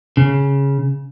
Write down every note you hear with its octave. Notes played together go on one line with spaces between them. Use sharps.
C#3